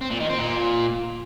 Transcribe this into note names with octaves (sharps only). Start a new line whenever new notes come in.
C4
A#2
D#3
C4
A#2